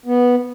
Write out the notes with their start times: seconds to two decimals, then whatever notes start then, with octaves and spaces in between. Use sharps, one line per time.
0.06 B3